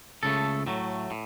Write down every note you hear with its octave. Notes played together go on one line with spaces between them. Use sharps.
C#2 C#3 A3 A4
A2 F#3 A3
A2